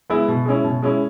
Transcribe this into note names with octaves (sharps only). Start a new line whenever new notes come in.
G#3 B3 E4
B2
G#3 C#4 E4
B2
G#3 C#4 E4